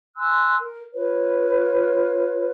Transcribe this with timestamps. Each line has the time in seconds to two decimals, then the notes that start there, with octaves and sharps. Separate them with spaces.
0.17 G#5 C6 E6 F#6
0.58 A#4
0.94 F4 B4 C#5